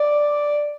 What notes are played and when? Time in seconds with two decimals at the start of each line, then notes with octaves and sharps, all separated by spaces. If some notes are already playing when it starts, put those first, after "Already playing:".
Already playing: D5